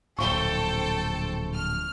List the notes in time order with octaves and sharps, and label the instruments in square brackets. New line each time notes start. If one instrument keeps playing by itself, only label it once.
[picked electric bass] D1 A#1 [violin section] A4 C5 G5 [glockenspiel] C#6 G7
[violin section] F6